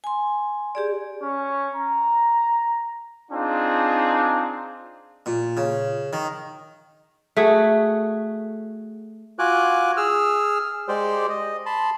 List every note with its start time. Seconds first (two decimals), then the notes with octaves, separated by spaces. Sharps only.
0.04 G#5 C6
0.75 G4 G#4 D5
1.23 C#4
1.76 A#5
3.32 C4 D4 D#4 F4 G#4
5.26 A#2
5.57 C#3
6.13 D#3
7.37 A3 F#4 G#4
9.39 F4 F#4 G#5 D6 F#6
9.97 G#4 E6 F6
10.88 G#3 G4 C5 D5
11.29 D#5
11.66 A5 B5 C6